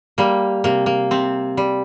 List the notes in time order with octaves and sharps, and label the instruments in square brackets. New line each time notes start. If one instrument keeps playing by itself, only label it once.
[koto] G3 A#3
C3 A#3
A#3
C3 C4
G3